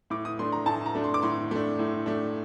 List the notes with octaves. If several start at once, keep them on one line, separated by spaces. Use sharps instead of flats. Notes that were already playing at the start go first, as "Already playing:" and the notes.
A2 D6
D#6
A3 D4 C6
A#5
A2 A5
A#5
A3 D4
C6
D6
A2 C6
A3 D4
A2
A3 D4